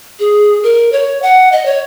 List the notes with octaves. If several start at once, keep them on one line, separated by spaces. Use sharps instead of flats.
G#4
A#4
C#5
F#5
D#5
C#5